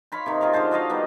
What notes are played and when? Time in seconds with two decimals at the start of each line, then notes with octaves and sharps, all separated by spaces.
0.12 C#5 F5 B5 C6
0.26 C3 D#3
0.41 F4 G#4 A#4 F5
0.53 D3 G#3 C5 A5
0.71 F#4 A4 D#5 F5
0.90 D#3 G3 B3